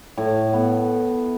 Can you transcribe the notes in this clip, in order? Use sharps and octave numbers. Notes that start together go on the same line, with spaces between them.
A2
B3